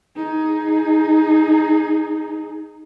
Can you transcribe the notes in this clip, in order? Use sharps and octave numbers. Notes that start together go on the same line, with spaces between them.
D#4 G#4